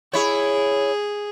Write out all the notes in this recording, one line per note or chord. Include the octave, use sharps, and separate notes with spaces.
E4 G#4 C#5